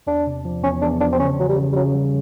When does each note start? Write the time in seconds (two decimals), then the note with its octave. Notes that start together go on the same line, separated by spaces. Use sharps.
0.07 E2 D4
0.27 C3
0.45 F3
0.63 E2 C#4
0.82 E2 D4
1.00 F3 D4
1.12 C4
1.19 C#3 C#4
1.39 E3 F#3
1.48 G3
1.57 C#3
1.72 G3
1.76 C#3 F#3
1.95 G3